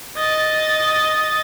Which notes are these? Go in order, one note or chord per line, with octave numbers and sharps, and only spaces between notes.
D#5 A6